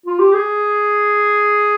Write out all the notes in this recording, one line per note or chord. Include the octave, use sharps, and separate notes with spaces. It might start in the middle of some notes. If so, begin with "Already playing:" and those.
F4
G4
G#4